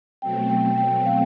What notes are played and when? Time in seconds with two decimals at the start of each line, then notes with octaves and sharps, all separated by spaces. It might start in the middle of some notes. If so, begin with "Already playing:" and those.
0.22 B2 F#3 A3 C4 G5
0.50 G5
0.78 G5
1.06 F5